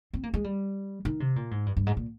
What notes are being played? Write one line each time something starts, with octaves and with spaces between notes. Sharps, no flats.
C4
A#3
G#3
G3
D#3
C3
A#2
G#2
G2
G2
G#2
A#2